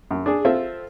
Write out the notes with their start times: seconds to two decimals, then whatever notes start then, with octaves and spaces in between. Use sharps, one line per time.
0.11 F#2
0.26 D4 G#4
0.45 C4 F4 A4 E5